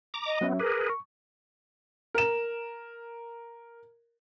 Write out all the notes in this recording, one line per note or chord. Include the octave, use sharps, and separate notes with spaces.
A#5 D6
D#5
F#3 B3 C#4 E5
G#4 A#4 B4 D6
C#6
A#4 E7